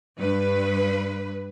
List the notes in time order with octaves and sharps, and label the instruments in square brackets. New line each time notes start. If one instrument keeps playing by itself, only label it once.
[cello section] G2 B4